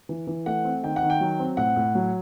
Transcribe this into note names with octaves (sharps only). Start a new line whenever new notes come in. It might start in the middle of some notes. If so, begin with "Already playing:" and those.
E3
E3
A3 F#5
C4
D#3 G5
F#5
D#3
G5
F#3
C4
A2 F#5
A2
F#3